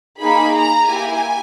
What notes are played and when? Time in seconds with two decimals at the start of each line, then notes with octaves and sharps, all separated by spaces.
0.20 A#3 D#4 G#4 B5
0.55 A#5
0.89 A#3 E4 G4 G#5